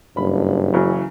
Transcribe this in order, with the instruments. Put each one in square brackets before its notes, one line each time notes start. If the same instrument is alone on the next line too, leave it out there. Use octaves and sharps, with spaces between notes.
[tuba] F#1 [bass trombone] G2 [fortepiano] B5
[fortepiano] C#3 E3 F#3